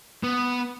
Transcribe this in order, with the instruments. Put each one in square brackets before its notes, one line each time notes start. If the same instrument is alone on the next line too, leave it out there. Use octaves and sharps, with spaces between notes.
[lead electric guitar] B3